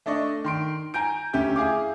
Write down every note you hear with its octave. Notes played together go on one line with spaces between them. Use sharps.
A3 D4 D5 D#5 C#6
D#3 C6 D7
G#5 A#5 G6 D7
D2 C#4 G4 E5 G6
E4 G#4 F5 D6